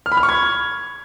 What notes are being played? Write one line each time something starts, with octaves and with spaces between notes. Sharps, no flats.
F6
B5
F6
C#6
G#6